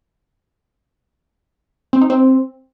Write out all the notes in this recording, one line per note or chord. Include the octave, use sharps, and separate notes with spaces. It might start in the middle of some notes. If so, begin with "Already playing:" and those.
C4
D#4
C4